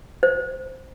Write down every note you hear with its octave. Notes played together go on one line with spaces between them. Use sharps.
C5